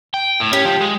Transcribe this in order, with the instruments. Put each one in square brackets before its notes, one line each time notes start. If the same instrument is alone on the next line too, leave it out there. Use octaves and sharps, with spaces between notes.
[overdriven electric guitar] G5
A2
[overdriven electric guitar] C#4 [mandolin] G4
[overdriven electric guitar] F3
G#3